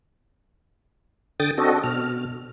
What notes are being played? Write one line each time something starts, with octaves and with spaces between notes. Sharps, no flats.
D3 G5 D#6 A6
C4 D4 F#4 A4 D#5
B2 F6